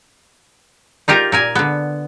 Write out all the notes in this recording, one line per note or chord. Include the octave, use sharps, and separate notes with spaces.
D#4 F4 G4 A#4
A#2 A#4 G#5
D3 B3